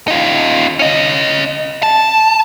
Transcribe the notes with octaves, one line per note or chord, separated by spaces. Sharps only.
D#4 F4
C#4 D#5
A5